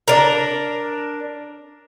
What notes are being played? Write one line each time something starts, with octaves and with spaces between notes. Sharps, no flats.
D4 A#4